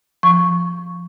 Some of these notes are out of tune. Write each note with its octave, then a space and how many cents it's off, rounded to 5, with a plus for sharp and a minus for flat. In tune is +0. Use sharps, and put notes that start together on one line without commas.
F3 +0 C#6 +0